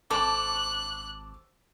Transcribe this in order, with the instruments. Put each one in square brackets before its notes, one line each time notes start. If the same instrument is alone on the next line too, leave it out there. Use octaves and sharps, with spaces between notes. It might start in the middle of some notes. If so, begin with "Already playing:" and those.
[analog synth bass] G#1 [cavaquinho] A4 C5 [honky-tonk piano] A5 C#6 D6 [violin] F#6